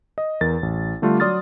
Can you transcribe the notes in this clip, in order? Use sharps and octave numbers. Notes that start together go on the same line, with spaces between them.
D#5
E2 A#4 A6
A1
D3 G3 A3 D4 F4
F#3 D5 C6 D#6 F6 A6